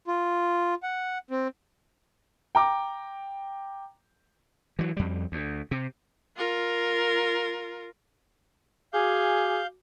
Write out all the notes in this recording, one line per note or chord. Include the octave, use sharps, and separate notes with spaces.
F4
F#5
C4
G5 A#5 D6
E3 F#3
F2 G3
D2
C3
F4 A#4
F#4 G#4 F5 G#5 D6 G6